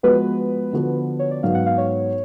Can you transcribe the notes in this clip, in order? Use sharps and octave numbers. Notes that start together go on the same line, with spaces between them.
F3 G#3 B3 F#4 B4
D3 F3 B3 F#4
C#5
D5
G#2 F#3 B3 F5
F#5
F5
C#5